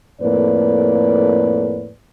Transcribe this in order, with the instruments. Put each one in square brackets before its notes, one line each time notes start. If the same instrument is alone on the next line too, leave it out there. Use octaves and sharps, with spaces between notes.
[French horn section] F2 A2 A#3 B4 D5